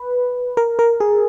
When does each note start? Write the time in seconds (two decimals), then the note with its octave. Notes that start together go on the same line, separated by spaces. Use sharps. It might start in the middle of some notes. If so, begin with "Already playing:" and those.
Already playing: B4
0.57 A#4
0.79 A#4
1.00 G#4